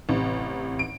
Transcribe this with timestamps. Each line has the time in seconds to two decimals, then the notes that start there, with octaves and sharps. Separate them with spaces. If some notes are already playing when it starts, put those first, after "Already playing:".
0.09 A1 C3
0.79 D7